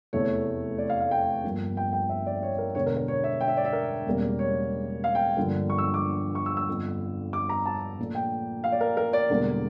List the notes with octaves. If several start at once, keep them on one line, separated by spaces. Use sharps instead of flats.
F1 E2 E3 A3 C#5
D5
F5
F5
G5
G1 G2 F3 A#3
G5
G5
E5
D5
C#5
A#4
E1 E2 D3 C#5
A#4
A#4
C#5
E5
G5
E5
D5
E5
A#4
E1 E2 C#3 G3 A#3
C#5
F5
G5
G1 G2 D3 F3 A#3
C#6
E6
D6
C#6
E6
E6
G1 F2 D3 F3
D6
A#5
A5
A#1 A#2 A3
G5
F5
D5
A#4
A#4
D5
E1 E2 D3 G3 A#3